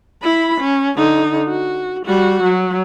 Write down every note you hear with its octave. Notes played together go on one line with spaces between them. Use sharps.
E4 B5
C#4
D3 D#4
F#4
G3 F#4
F#3